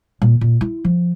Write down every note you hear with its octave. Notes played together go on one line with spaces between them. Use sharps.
A#2
A#2
E4
F3